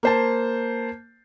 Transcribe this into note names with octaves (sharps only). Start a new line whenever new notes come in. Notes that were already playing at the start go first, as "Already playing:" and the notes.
A#3 C5 A5